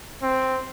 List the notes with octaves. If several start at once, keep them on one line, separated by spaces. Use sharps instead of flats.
C4